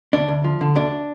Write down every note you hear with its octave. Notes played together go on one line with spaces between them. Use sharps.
D2 D4
D2
F3
D3
D2 D4